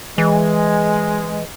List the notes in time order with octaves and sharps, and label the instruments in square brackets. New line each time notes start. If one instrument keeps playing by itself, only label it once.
[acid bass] E3 [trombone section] G#3